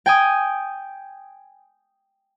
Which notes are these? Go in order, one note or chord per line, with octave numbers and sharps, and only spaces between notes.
G5 G#5 D#6